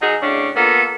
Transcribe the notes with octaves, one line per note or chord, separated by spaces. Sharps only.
F#3 D#4 F#4 G#4
A2 C#3 D4
A#3 B3 F4 A4